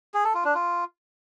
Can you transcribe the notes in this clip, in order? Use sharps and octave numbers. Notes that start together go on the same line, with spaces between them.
G#4
A4
F4
D4
F4